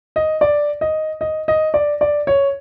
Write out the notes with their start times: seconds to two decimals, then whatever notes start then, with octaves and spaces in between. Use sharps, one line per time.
0.16 D#5
0.41 D5
0.81 D#5
1.21 D#5
1.48 D#5
1.74 D5
2.01 D5
2.27 C#5